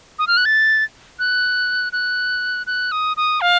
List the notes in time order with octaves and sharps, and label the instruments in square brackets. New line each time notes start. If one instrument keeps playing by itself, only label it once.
[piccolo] D#6
F6
F#6
A6
F#6
F#6
F#6
D#6
D#6
F5